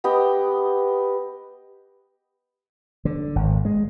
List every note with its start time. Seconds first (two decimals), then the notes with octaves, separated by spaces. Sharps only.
0.04 B3 G4 D#5 G5
3.05 D3
3.36 G#1
3.65 G#3